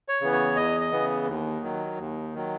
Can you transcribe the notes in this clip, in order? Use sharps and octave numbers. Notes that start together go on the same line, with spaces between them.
C#5
C#3 E3 B3
C#5
E2 D#5
D#5
C#3 E3 B3
D#2
D#3 F#3
D#2
D#3 F#3